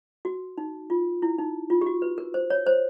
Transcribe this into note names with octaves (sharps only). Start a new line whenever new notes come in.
F#4
D#4
F4
E4
D#4
F4
G4
F#4
B4
A#4
C5
C#5
C5